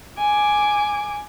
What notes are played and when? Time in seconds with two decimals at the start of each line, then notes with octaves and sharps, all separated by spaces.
0.18 G#5 D6